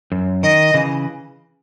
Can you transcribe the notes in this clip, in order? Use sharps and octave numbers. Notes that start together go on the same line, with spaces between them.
F#2
D#3 D#5
C#3 E3